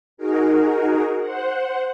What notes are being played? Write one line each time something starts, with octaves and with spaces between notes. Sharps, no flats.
D#4 F#4 G#4 A#4
C5 F#5